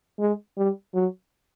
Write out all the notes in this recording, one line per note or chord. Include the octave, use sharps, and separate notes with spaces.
G#3
G3
F#3